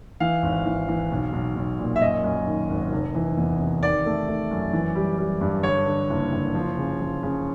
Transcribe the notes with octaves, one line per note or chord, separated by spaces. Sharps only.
E3 F5
G#1
E3
E3
B1
B1
B1
A#2
E5
F#2 D#5
F#2
D#3
G#1
F1
E3
E2
C3
D#3 D5
A3
A3
F#2
E3
G3
G3
G2
D3 C#5
D3
F#1
F#1
F3
C#3
F3
C#3